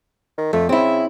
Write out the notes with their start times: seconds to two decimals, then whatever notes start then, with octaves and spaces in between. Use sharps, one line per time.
0.38 D#3
0.53 F2 A3
0.69 C#3 C4 E4